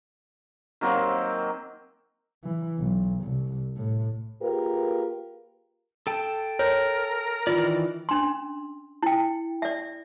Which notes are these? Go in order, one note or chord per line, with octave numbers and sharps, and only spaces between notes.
D#3 F#3 A#3 C4
E3
B1
C2
A2
A#3 F4 G4 G#4 A#4 B4
A4 G5 A5
A#4 C#5
D#3 E3 F4 D5
C#4 D4 C6
E4 G5
D5 E5